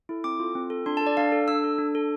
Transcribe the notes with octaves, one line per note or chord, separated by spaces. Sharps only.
E4 A4
C4 D6
F4 A4
C4
F4 A4
D4 C6
A5
A4
D5
D4 F5
A4
D4 E6
A4
D4
A4